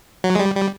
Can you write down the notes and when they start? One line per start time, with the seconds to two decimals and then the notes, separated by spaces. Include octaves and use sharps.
0.24 F#3
0.35 G#3
0.39 G3
0.56 G3